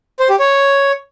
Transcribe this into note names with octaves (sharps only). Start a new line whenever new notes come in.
C5
G4
C#5